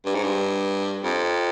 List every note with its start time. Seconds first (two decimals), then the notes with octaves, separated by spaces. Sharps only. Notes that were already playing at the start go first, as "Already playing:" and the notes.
0.06 G2
0.14 G#2
0.23 G2
1.03 F2